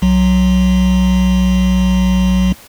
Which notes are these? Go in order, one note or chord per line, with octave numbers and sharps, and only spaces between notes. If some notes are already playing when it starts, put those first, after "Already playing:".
B1 F#3